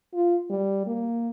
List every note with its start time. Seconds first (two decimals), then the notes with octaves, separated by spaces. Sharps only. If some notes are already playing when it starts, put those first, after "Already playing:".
0.14 F4
0.50 G3
0.87 A#3